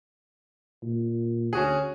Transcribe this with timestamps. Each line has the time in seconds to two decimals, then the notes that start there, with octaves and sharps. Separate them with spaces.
0.82 A#2
1.53 D2 C#4 F#4 G#4